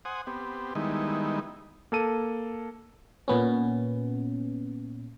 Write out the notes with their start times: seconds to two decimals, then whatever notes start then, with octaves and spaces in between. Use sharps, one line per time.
0.05 C5 F#5 G#5 D#6
0.27 B3 C4 G4
0.75 D#3 G3 G#3 B3 D#4 E4
1.92 A#3 A4 D#7
3.28 A#2 B3 C#4